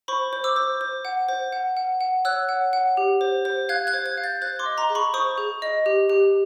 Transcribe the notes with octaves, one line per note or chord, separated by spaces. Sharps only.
C5 B5 C#6
C5
D6 E6
C5
C5
F#5
C5
F#5
F#5
F#5
C#5 E6 F#6
F#5
F#5
G4
C5
C5
F5 F#6 G#6
F#6 G#6
C5
F#6 G#6
F5
G6 A6
C5 F#6 G#6
C6 D6
D#5
A#5 C6
G#4
B5 C#6
C5 C#6 D#6
G#4
D#5
G4
G4